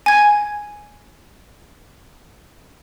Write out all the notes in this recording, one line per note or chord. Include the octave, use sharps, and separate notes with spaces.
G#5 G#6